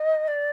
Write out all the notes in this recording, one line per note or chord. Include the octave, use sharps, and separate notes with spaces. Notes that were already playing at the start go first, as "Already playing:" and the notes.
Already playing: D#5
D5